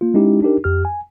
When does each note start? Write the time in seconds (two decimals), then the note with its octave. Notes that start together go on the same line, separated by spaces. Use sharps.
0.01 A#3 F4
0.14 G#3 C#4 D#4 E4 G4
0.42 D4 D#4 G4 A#4
0.64 F2 G4 F6
0.85 G#5